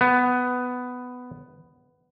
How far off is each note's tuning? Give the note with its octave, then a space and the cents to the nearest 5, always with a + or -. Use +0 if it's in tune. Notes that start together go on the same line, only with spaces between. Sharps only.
B3 +10